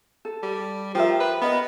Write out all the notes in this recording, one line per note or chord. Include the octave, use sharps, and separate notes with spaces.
A4
G3
F3 G4 A#4 E5
B4
B3 A#4 D#5 F#5